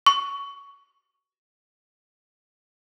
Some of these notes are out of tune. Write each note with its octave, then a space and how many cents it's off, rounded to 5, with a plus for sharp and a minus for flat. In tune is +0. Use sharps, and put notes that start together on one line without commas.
C#6 +15